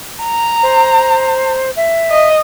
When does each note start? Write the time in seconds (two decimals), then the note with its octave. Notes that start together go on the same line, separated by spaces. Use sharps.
0.23 A#5
0.62 C5
1.76 E5
2.11 D#5